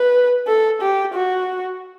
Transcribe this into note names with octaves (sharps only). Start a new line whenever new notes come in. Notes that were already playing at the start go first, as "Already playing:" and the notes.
Already playing: B4
A4
G4
F#4